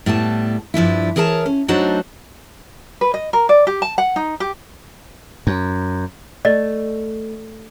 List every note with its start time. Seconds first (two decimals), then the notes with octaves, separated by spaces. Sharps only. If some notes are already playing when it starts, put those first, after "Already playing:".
0.06 A2 G3 B3 A5
0.74 G2 F3 D4 E4
1.16 E3 G#4 A#4 C#5 A5
1.46 C#4
1.68 F#3 A3 D4 D#4 F#4 C5
3.01 B4
3.14 D#5
3.33 A#4
3.49 D5
3.67 G4
3.82 A5
3.98 F#5
4.16 D#4
4.40 G4
5.47 F#2
6.45 A3 D5 D#5